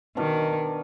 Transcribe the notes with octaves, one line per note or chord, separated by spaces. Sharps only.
B2 D#3 D4 F5